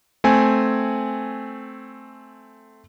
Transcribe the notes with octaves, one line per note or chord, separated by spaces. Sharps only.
A3 C4 G#5